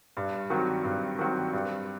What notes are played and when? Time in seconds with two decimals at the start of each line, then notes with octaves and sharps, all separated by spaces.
0.17 G2
0.50 D#3 F#3 C4 F#4
0.85 G2
1.19 D#3 F#3 C4 F#4
1.53 G2